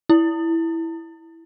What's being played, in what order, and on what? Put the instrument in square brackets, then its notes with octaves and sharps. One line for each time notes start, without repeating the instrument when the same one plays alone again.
[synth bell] E4